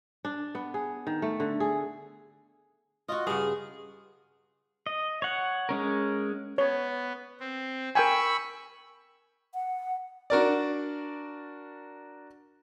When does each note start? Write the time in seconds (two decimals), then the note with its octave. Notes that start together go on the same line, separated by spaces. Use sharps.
0.25 D4
0.55 B3
0.74 G#4
1.07 D#3
1.22 A3
1.40 D3
1.60 G#4
3.08 F4 F#4 D#5
3.27 G2 C#3 G#4
4.86 D#5
5.22 C#5 F#5
5.69 G#3 C#4 A#4
6.58 B3 C#5
7.40 C4
7.95 A#4 G5 G#5 B5 C#6 E6
9.54 F#5
10.30 D4 F#4 A#4 D5